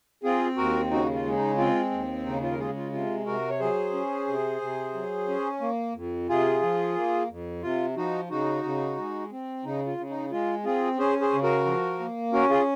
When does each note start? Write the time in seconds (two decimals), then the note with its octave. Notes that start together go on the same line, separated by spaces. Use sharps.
0.23 C4 F4 G#4
0.57 D#2 F#4 A#4
0.91 C#3 D#4 F#4
1.13 F4
1.25 G#3
1.36 D#4
1.58 C4 F4
1.91 D#2
2.26 C#3 D#4
2.43 F4
2.51 A#4
2.59 G#3 F4 G#4
2.76 F4
2.92 C3 F4
3.26 C3 F#4 A#4
3.49 C#5
3.59 F#3 G#4 C5
3.93 C#4
4.27 C3
4.61 C3
4.94 F#3
5.28 C#4
5.61 A#3
5.95 F2
6.29 C3 F4 G#4
6.62 F3
6.96 A#3
7.30 F2
7.62 C3 F4
7.96 F3 D#4 F#4
8.30 C#3 D#4 F#4
8.64 C#3
8.97 G#3
9.31 C4
9.65 C#3 D#4
9.86 F4
9.98 C#3
10.10 D#4
10.31 G#3 F4
10.65 C4 F4 G#4
10.98 C#4 G#4 C5
11.21 G#4 C5
11.32 C#3
11.43 F#4 A#4
11.66 F3
12.00 A#3
12.33 C#4 F#4 A#4
12.49 F4 G#4